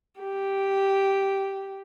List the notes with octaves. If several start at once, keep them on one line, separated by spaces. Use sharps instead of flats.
G4